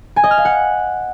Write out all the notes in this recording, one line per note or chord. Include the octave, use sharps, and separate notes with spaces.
G#5
D#5
F6
F5
F#5